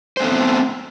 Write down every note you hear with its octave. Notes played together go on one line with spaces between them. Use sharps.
A3 B3 C4 A4 C5